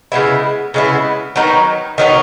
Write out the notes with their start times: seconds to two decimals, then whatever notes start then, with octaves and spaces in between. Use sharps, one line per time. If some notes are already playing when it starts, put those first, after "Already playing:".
0.12 C#3 G#3 B3 E4
0.74 C#3 G#3 B3 E4
1.36 D#3 F#3 B3 D#4
1.98 D#3 F#3 B3 D#4